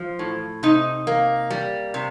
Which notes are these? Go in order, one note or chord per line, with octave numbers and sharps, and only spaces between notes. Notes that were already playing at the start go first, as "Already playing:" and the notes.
Already playing: F3
A2
C3 D#4
A#3
G3
C3